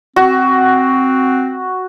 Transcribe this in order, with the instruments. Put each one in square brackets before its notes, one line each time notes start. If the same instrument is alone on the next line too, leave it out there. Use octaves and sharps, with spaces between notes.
[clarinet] C4 [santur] F#4